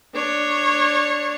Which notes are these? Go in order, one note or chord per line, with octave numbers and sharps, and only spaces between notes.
D4 C#5